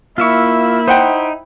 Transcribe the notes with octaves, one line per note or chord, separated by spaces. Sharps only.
A#3 E4 F4 E5 C#6
D#4 C5 F#5 G5